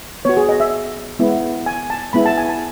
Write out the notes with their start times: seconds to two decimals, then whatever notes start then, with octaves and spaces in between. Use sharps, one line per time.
0.25 B3 F#4 C#5
0.37 G#4
0.49 D#5
0.60 E5
1.19 G#3 B3 E4
1.66 G#5
1.90 A5
2.13 G#3 B3 E4 B5
2.26 A5
2.38 G#5
2.49 A5